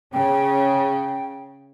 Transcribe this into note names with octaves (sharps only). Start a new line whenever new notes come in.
C#3 G5